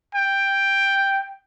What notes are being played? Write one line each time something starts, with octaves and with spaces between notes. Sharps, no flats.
G5